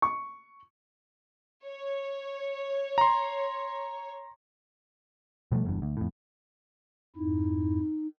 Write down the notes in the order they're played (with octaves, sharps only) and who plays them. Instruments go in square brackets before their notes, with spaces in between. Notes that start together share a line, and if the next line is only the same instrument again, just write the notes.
[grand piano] C#6
[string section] C#5
[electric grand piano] A#5 C6
[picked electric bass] B2 F3 G3 A3
F#1 E2 G2
D2
F2 A2
[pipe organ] F2 G#2 E4 [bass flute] D#4